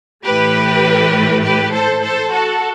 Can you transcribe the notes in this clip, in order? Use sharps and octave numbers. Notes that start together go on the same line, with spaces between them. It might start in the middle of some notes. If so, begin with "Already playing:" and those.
A2 E3 A3 G4 B4
G4 B4
A4 C5
A4 C5
F#4 A4